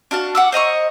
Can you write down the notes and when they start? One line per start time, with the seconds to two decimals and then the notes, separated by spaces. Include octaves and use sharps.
0.11 D4 F#4 F5 A5
0.35 F#5 D6 E6
0.52 C5 D#5 A#5 C#6